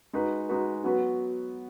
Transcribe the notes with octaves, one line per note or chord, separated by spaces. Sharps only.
G#3 D#4 F#4 B4
G#3 D#4 F#4 B4
F#3 B3 F#4 B4